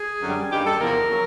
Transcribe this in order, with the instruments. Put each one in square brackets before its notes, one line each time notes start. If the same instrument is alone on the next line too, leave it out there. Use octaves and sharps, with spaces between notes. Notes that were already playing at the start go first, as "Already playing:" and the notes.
Already playing: [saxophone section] G#4
F#2 D3 G3
G2 D#3 G3 A#3 G4
A4
E2 C3 F3 A#3 A#4
C#3 F#3